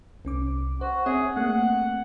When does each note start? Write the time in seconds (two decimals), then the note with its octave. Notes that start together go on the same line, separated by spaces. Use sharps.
0.25 C2 C#4 D6
0.81 F#4 C5
1.06 C4 G#4 C#5 E5
1.36 A3 A#3 C4 F#5